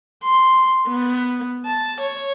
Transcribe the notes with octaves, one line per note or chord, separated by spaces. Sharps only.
C6
B3
A5
C#5